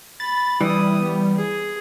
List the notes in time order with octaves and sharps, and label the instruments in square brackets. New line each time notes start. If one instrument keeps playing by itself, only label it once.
[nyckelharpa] B5 [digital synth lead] A6
[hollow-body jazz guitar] E3 [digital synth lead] G3 [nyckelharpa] E4 D#6
[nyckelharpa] B3
G#4